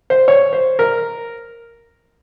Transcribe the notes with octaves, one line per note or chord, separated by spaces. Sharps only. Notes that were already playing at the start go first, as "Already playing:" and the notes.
C5
C#5
C5
A#4